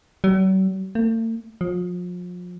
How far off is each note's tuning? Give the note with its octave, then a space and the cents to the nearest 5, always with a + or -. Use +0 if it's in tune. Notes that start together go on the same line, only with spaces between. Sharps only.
F#3 +45
A3 +45
F3 +35